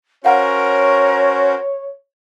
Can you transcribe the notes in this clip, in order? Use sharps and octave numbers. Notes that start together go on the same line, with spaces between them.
C#4 F#4 A#4 C5 C#5 F5 F#5